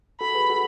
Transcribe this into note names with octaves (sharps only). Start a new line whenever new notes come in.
F#4 A4 B5
G#4 B4
F#4 A4